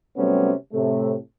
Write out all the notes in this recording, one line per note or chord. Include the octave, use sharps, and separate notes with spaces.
C3 F#3 G3 A3 B3 C#4
A2 C3 A3